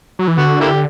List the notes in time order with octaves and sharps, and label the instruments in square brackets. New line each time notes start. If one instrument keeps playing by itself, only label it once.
[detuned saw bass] F#3
E3
[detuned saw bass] D3 [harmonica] B3 F#4
[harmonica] A#3 E4 G4